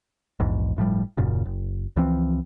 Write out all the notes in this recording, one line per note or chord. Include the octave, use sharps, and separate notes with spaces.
A#1 E2 G#2
G1 A2 F3 G3
D#1 F#2 A#2 C#3
F#1
C#2 E3 F3 C4